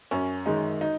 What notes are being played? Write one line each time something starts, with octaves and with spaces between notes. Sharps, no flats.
F#2 C#4
D#3 G#3 D#4
D#4